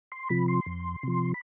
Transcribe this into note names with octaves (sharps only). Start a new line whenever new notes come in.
C6
C3 F3 B5
C6
F2
C3 F3
B5